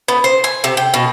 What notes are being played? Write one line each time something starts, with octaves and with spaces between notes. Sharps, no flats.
B3
C5
G#5
C3
G5
B2